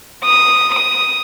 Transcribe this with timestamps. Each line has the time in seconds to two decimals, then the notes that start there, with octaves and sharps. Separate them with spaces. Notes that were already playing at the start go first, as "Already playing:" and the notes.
0.24 D#6
0.74 D#6